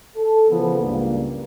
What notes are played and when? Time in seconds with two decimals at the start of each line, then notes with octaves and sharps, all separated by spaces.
0.17 A4
0.49 C#3 E3 F3 B3
0.80 C#2 G2 A#3